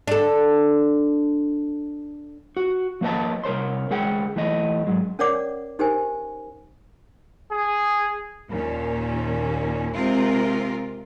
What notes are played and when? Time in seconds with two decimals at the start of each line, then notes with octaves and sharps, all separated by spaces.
0.07 D4 A4
2.57 F#4
3.01 F3 A#3 B4 D#5 A5
3.44 C2 A#4 C#5 C6
3.90 D2 G#3 G#4 F#5 G5
4.36 E3 A3 D#5
4.87 G#2 F#3 G#3
5.19 C#4 A#4 C#5 D5 F#5 D6
5.79 D#4 G4 A#4 C5 G5 G#5
7.50 G#4
8.49 D#2 A#2 C#4
9.95 C3 G#3 C4 F4 A#4